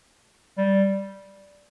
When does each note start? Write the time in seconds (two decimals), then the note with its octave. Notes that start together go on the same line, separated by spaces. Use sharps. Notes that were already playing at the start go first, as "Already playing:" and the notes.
0.58 G3